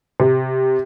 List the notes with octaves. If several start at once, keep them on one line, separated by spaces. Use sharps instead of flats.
C3